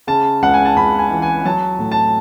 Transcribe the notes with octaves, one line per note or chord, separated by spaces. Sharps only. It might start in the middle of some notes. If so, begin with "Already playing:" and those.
C#3 A5
C#2 F#5
G#5
A5
C#2 B5
G#5
E3
G#5
F#3 A5
A2
A5